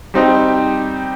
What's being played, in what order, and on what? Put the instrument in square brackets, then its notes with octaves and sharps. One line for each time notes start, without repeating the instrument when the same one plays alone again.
[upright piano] G3 C4 D#4 G4